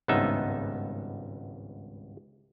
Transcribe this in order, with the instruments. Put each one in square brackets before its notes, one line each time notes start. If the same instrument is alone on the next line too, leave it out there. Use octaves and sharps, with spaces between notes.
[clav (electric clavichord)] G#1 C#2 G2 B3 D#4 E5